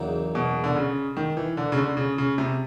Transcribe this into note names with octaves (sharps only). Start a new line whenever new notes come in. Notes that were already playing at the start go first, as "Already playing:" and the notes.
Already playing: E2 C#3 F#3 A#3 D#4
B2
D3
C#3
D#3
E3
D3
C#3
D3
C#3
C#3
C3